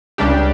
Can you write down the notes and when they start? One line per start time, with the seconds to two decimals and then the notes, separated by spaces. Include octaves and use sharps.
0.18 C#2 C#3 G3 D4 G4